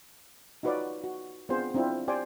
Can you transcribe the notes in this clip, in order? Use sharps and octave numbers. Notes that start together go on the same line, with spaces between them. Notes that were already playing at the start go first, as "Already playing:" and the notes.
D#4 F4 F#4 B4 C#5 D5
F#4
B3 C4 D4 F4 G#4 C5
C4 D4 E4 F4
G4 C5 D5 G5 G#5